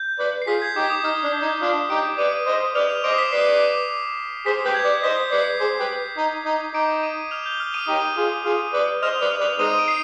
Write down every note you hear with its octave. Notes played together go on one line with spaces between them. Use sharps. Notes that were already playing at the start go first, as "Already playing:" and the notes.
Already playing: G6
B4 D5
C7
F4 G#4 B6
G#6
D#4 G4 D6
D#6
D#4 F6
D4
G6
D#4 G#6
G6
D4 F4
D#4 G4 D6 D7
D7
B4 D5 D#6 D#7
C5 D#5
B4 D5 F6 F7
F6 F7
C5 D#5 D6 D7
C7
B6
B4 D5 C7
G#4 C5 B6
G4 B4 G6
G#6
B4 D5
C5 D#5 B6
B4 D5 C7
G#4 C5
G4 B4
D#4
D#4
D#4 D6 D7
D#6 D#7
F6 F7
G6 G7
F6 F7
D#6 D#7
D#4 G4 D#6 D#7
F4 G#4
F4 G#4
B4 D5
C5 D#5 F6 F7
B4 D5
F6 F7
B4 D5
G#3 C4 D#4 D#6 D#7
D7
C7